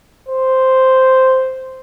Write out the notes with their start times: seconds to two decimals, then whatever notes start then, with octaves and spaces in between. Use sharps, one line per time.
0.28 C5